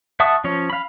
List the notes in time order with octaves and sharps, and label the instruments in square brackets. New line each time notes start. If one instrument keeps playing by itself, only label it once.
[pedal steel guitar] E5 F#5 A5 C#6 D#6
F3 C#4 C#5
F5 B5